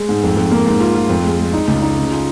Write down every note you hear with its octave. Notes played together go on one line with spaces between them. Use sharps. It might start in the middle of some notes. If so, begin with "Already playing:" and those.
Already playing: G#3
G#2
F2
F2
A#3
G#2
F4
F4
F2
G#3
G#3
D#4
C#2
D#4
C#3
F4